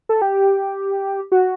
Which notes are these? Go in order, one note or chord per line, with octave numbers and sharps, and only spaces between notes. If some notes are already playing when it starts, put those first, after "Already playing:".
A4
G4
F#4